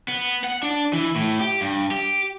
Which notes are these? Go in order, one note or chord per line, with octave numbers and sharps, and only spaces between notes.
B3
F#5
D4
E3
A2
G4
G2
G4